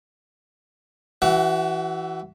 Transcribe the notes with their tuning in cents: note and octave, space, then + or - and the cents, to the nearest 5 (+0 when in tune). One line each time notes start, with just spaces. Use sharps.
E3 +0 F#4 +35 F#5 +0